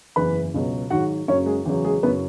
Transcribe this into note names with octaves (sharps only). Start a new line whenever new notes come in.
F#1 E2 E3 B4 B5
C#2 B2 F#3
G#1 G#2 F#3 F#4 F#5
F#1 F#2 C#3 F#3 C#4 C#5
G#3 G#4
E2 C#3 F#3
G#3 G#4
F#1 F#2 C#3 F#3 B3 B4